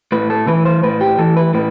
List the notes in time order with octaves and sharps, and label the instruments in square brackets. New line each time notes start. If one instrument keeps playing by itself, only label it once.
[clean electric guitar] A2 B4
A4
E3 B4
C5
A2 B4
G4
E3 A4
B4
A2 B4